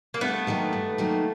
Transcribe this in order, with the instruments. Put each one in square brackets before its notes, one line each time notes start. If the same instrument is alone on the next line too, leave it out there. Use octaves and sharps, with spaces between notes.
[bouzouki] A#3
[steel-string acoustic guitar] G2 [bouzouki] A3 B3
[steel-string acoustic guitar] D#3 F#3 A#3 D#4
G2
D#3 F#3 A#3 D#4